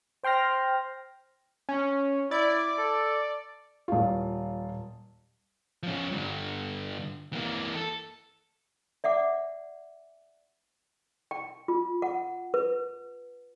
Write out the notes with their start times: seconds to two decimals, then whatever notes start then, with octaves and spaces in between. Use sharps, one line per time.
0.24 C5 G5 C6 F6 A#6
1.69 C#4
2.31 E4 D5
2.78 A4
3.88 D#1 F4
5.83 F3 C#4
6.12 G2 D3
7.33 E3 A#3
7.75 A4
9.04 D5 E5 F#5 D6
11.31 G5
11.68 F4
12.02 F#5
12.54 B4